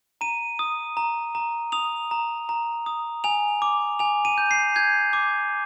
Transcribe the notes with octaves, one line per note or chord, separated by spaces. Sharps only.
A#5 D#7
D#6
A#5
A#5
D#6 F7
A#5
A#5
D#6
G#5 F7
D6
G#5 F7
D#7
G6
C7
G6 G#6
D6